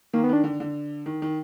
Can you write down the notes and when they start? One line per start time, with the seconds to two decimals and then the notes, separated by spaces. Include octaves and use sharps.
0.13 D#3 A#3
0.24 B3
0.29 D#3 D4
0.44 D3
0.60 D3
1.06 D#3
1.22 D#3